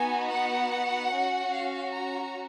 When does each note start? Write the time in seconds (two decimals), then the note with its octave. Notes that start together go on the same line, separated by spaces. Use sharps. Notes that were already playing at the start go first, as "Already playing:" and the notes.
Already playing: B3 D#4 F#4 G#5
0.29 F#5
1.11 C#4 F#4
1.52 F5
1.93 A#5